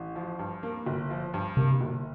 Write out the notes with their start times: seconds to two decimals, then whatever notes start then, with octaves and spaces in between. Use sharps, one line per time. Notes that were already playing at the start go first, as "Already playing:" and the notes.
Already playing: A1
0.16 F3
0.39 G2
0.63 A#3
0.86 G1
1.10 F3
1.34 G2
1.57 C3 A#3
1.81 G1